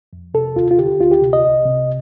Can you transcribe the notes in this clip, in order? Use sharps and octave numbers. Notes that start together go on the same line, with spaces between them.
F2
C3 A4
D#2 F4
F4
D3 G4
D2 F4
G4
C3
D#5
C2
C3